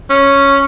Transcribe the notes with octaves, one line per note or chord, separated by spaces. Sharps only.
C#4